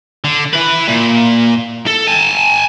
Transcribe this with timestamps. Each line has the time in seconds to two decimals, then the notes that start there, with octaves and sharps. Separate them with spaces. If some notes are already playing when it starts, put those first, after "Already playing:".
0.25 D3
0.53 E4 B4
0.88 A#2
1.87 A4
2.07 G#5 A5